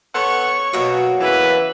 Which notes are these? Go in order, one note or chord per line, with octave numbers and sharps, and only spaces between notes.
B3 A4 C#5 F#5 C#6
B2 F#3 A#3 F#4
C#3 E3 B4 E5